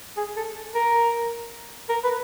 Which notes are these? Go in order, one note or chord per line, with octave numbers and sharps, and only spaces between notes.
G#4
A4
A#4
A#4
B4